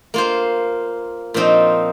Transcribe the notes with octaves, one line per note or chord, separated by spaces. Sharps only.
A#3 F4 C5
A#2 F3 C4 D#4